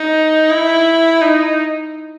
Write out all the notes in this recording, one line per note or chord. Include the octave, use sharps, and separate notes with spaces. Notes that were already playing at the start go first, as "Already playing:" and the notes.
Already playing: D#4
E4
D#4